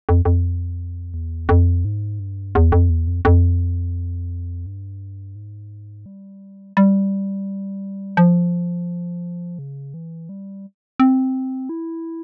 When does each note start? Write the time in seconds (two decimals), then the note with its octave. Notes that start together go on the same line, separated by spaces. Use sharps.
0.09 F2
0.25 F2
1.14 E2
1.49 F2
1.85 G#2
2.20 G2
2.55 E2
2.72 F2
2.90 E2
3.07 F2
3.25 F2
4.66 G2
5.35 G#2
6.06 G3
6.77 G3
8.17 F3
9.59 C#3
9.94 E3
10.29 G3
11.00 C4
11.69 E4